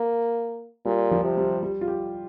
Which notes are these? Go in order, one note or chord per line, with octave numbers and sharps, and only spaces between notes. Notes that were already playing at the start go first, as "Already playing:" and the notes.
Already playing: A#3
A#2 G3
F3
C3
G3
G3
F4
G4